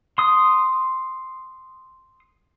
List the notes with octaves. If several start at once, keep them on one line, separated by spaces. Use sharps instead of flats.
C6 D#6